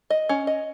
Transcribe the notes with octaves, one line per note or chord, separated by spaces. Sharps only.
D#5
C#4
D#5